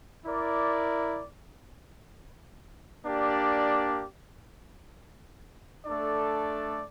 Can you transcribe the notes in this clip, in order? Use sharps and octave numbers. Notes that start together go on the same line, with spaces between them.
E4 A#4 D5
A#3 D4 G4 D5
A3 D4 A4 D5